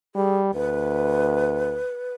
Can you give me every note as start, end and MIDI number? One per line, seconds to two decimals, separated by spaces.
0.15 0.51 55
0.15 0.39 68
0.54 1.79 38
0.54 2.14 71